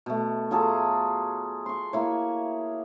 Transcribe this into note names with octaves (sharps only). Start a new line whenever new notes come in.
B2 A3
F#3 F4 G#4 A4
C6 C#6
A#3 E4 C#5